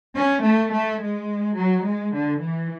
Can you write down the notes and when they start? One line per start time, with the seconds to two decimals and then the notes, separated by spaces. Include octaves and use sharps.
0.15 C#4
0.44 A3
0.72 A3
1.01 G#3
1.56 F#3
1.85 G#3
2.14 D3
2.41 E3